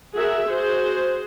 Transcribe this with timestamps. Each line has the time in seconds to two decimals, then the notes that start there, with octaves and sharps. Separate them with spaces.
0.14 F#4 G#4 A#4 E5
0.48 F#4 G#4 C5